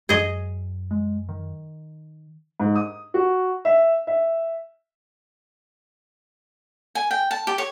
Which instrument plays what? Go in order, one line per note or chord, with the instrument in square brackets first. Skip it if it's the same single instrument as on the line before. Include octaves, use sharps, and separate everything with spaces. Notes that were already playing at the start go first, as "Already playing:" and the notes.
[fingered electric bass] F#2 [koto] G#4 D#5
[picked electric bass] G#3
D#3
[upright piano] G#2
D#6
F#4
E5
E5
[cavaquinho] G#5
G5
A5
G4
C#5